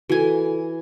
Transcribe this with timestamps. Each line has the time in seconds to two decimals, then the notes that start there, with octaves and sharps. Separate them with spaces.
0.09 E3 F#4 A4 G#5